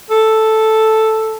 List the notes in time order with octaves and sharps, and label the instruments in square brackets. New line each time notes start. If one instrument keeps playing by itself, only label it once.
[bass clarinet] A4